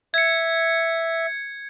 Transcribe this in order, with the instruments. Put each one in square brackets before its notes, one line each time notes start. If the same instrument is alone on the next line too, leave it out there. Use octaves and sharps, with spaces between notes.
[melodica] E5 [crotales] G#6 C#7